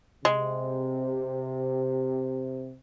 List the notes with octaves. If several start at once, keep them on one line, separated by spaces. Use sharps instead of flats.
C3 G#3